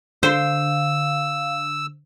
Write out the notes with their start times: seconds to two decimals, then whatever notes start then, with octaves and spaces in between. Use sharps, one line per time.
0.23 D3 C5 F5 E6